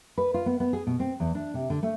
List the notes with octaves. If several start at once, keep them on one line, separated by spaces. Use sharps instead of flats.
B4
F4
B3
B3
G#4
B2
C4
E2
D4
C3
D3
A3